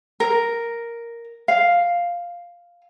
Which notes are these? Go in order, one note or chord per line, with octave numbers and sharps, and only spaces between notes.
A#4
F5